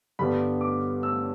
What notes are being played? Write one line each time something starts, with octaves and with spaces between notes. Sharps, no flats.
G2 D3 G3 B3 D4 B5
D6
E6